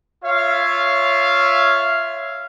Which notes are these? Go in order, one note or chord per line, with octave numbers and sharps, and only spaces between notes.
F4 C#5 E5 F5